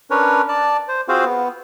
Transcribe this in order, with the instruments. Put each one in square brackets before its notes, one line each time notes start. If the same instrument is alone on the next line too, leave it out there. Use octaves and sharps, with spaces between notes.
[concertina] C#4 D4 A#4 B4 C#5
D5 A5
C5
C4 F4 F#4 G#4 C5 F5
B3